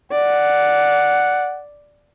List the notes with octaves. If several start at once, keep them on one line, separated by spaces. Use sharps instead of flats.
D5 F#5